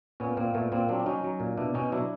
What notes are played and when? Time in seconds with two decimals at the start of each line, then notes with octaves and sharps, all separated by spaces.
0.20 A#2 B3 C#4
0.37 A#2 A#3 C4
0.54 A#2 A3 B3
0.72 A#2 A#3 C4
0.89 F#3 C4 D4
1.00 D4
1.06 F#3 C#4 D#4
1.24 F#3
1.40 A#2
1.58 B2 D4 E4
1.74 B2 C#4 D#4
1.92 F#3 D4 E4